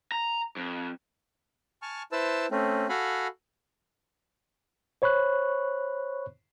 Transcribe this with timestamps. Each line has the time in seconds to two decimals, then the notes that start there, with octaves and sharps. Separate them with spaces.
0.12 A#5
0.57 F2
1.82 G#5 A5 C#6 F6
2.12 E4 B4 C5 A5 E6
2.51 A3 C4 C#4
2.89 F#4 A4 F5 F#5 G#5 B5
5.02 C5 C#5 B5 C#6 F#6